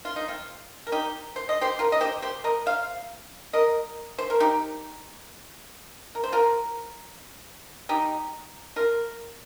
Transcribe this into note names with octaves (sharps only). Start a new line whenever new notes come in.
F4
D#4
C4 F4
A#4
D#4 G4
C5
D#5
G4 C5
F4 A#4
D#5
G4 C5
G4 C5
A#4 D#5
C5 F5
A#4 D#5
C5
A#4
D#4 G4
A#4
C5
F4 A#4
D#4 G4
F4 A#4